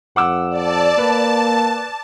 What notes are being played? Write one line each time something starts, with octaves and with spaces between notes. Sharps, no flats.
F2 F#5 D6 E6
D5 A5
A#3 B4 A5